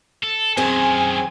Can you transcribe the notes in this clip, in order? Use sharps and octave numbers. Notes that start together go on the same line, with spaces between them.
A4
F#2 D#3 C4 G#4 G#5